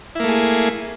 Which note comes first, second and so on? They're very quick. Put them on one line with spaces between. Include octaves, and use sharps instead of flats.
E4 A#3 A3 G#4